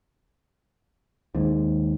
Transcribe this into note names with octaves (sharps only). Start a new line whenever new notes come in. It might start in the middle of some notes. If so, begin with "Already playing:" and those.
D#2 G#2